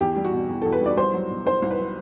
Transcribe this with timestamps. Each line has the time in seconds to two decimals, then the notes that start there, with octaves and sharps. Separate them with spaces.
0.01 E2 G4
0.16 G3
0.24 F#4
0.33 B2
0.49 E2
0.62 A4
0.65 E2
0.72 B4
0.81 G3
0.86 D5
0.97 C2 C5
1.14 F#3
1.30 B2
1.46 C2 C5
1.62 C2
1.71 B4
1.78 F#3